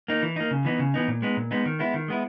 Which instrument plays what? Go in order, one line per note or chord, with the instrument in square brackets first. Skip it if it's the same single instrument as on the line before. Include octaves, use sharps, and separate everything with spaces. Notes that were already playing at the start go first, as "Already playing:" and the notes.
[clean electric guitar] A#3 D#4
E3
A#3 D#4
C#3
E3 B3 D#4
C#3
E3 B3 D#4
A#2
G#3 B3 D#4
A#2
G#3 B3 D#4
D#3
G#3 B3 E4
D#3
G#3 B3 E4